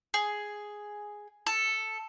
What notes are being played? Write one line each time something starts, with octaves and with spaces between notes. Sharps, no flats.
G#4
A4